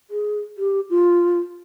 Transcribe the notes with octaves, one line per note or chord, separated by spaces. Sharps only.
G#4
G4
F4